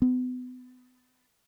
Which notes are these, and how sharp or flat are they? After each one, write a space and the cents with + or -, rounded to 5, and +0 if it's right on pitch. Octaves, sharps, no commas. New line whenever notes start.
B3 +30